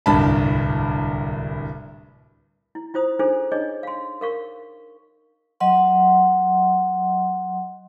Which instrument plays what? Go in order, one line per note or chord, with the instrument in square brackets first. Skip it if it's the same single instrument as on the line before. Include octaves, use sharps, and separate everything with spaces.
[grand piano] D1 C2 G2 A5 B5
[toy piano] E4
E4 F4 C5 D#6
D4 D#4 F4 G#4 A4 C5
D4 D#4 G#4 C#5 D#5
F5 C6
A#4 F5 C#6
[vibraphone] F#3 D#5 F#5 C6